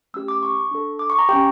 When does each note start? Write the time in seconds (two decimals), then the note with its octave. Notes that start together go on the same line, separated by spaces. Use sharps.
0.14 A3 C#4 G4 E6
0.28 D6
0.43 C#6
0.71 D4 A4
0.99 D6
1.10 C#6
1.19 A#5
1.29 C#4 G4 G5